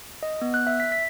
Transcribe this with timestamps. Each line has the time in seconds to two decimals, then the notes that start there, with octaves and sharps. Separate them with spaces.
0.23 D#5
0.42 B3
0.54 F#6
0.67 E5
0.80 B6
0.92 B6